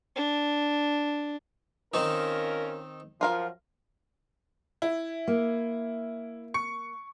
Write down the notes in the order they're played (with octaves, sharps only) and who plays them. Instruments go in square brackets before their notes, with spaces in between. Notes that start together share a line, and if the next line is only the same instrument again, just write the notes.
[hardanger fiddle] D4
[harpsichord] D#3 C4 D#4 [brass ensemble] C#4 F4 A#4
[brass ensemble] F#2 F3 [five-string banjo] F4 A#4 F5
[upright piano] E4
[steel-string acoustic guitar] A#3
[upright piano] C#6 C#7